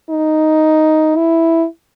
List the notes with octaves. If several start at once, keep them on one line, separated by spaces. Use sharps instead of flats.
D#4
E4